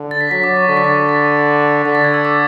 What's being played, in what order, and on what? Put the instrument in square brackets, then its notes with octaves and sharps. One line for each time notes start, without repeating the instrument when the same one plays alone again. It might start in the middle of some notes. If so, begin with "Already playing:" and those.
Already playing: [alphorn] D3
[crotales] A6
B6
[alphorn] F#3 [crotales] B6
[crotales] D6
C#6
[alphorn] D3 [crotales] A6
[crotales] B6
A6
A6
[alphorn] D3 [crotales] B6
[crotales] A6
G#6
E6
D6